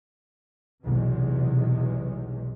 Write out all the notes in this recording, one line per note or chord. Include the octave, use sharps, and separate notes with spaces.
B1 E2 C3 G#3